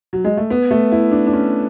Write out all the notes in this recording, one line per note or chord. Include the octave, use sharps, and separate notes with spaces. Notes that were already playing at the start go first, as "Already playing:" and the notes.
F#3
G#3
A3
B3
A3
E4
D4
D4
C#4